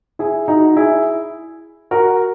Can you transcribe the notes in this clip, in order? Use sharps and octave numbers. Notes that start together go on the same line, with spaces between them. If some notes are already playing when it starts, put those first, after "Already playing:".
E4 G#4
D#4 F#4
E4 G#4
F#4 A#4